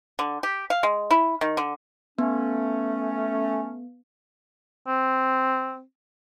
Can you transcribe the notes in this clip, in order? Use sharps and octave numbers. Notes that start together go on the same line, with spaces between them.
D3
G4
F5
G#3
E4
D#3
D3
A3 B3 C#4
C4